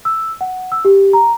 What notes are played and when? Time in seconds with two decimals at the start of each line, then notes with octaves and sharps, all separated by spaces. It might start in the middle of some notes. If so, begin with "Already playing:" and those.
0.05 E6
0.41 F#5
0.72 E6
0.85 G4
1.13 A#5